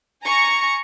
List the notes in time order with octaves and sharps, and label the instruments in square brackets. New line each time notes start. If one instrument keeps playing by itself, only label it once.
[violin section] G#5 A#5 C#6